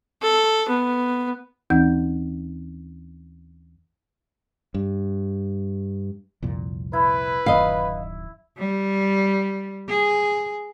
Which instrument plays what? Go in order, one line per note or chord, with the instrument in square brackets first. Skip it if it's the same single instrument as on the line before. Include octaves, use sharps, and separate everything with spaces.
[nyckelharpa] A4
B3
[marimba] D#2 E3 C4 D#4 F#5 G6
[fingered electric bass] G2
[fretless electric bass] C2 F2 A#2
[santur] E4 [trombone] B4
[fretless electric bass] D1 F#2 D#3 [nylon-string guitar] D#5 F5
[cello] G3
G#4